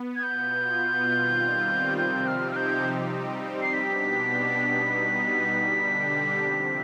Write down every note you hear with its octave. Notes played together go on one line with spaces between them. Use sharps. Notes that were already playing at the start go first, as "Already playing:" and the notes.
Already playing: B3
G#6
B2 B3 F4 G6
D#3 G3 C4 F4
C3 F3 C4 D#4 G4 G6
F6
F6
G6
G3 C4 D#4 G4
C7
B2 B3 D4 G4 B6
B2 G3 B3 D#4
D3 G3 D4 G4
C3 F3 C4